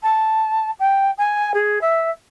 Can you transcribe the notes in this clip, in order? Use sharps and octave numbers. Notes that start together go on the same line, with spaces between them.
A5
G5
G#5
G#4
E5